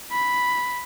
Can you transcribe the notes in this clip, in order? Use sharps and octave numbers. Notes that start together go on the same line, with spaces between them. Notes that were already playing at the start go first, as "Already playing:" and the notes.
B5